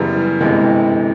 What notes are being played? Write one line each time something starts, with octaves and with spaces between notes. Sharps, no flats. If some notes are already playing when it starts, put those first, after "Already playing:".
Already playing: F#2 C#3 E3 G3 B3
G1 F2 C3 E3 G#3